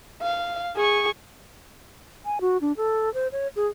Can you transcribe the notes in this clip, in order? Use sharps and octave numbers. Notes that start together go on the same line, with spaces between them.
F5
G#4 C#6
G#5
F#4
D4
A4
C5
C#5
G#4